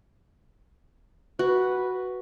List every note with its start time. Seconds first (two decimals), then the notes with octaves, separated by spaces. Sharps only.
1.39 F#4 B4